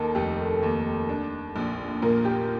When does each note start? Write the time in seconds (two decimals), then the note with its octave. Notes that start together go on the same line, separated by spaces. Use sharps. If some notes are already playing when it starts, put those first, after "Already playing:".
Already playing: D#2 D#3 A4 A#4
0.15 F1 G4
0.63 D#2
1.09 D4
1.56 A#1
2.02 A#2 A#4
2.25 G4